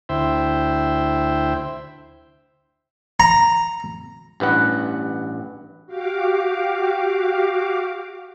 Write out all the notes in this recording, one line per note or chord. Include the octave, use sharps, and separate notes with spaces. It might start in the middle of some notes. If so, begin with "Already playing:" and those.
D2 E4 C5 E5 G5
A#5
A1 G2 B4 F#5
F#4 G4 F5 D6